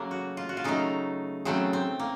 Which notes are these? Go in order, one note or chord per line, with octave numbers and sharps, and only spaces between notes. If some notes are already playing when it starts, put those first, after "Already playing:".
Already playing: C#3 F#3 A3 A#3
F#4
F4
F#4
F4
C#3 F#3 A3 D#4
C#3 F#3 A3 C4
C4
A#3